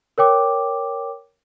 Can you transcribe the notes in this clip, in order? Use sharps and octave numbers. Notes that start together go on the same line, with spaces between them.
A#4 C#5 G5 D6